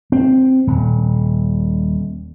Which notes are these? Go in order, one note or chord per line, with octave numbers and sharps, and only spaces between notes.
C4
D#1